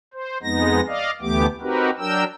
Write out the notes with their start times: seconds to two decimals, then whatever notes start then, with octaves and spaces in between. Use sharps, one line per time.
0.14 C5
0.43 F2 G#3 B3 D#4 A#6
0.87 D5 D#5 F5
1.22 D2 E3 A3 B3 G4 D6
1.61 C4 D#4 F#4 G4 A#4 B4
1.99 F#3 D4 A#4 G5 E6